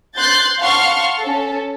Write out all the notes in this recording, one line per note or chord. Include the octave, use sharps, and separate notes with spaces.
C6 F#6 G6 A6
F5 F#5 A5 C6 C#6 F6
C#4 A4